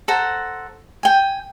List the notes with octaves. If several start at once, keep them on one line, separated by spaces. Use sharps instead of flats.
A4 C5 F#5 A#5
G5 G#5